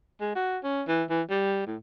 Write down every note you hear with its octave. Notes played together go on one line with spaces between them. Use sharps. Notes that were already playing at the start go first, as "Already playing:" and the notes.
G#3
F#4
C#4
E3
E3
G3
A2